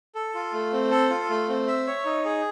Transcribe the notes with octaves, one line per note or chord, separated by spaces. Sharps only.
A4
F4
A3
C4
A4
F4
A3
C4
E5
C#5
D#4
G#4